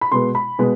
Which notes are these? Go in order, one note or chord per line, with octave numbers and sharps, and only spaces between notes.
B5
B2 G#3 B3 C6
B5
B2 G#3 B3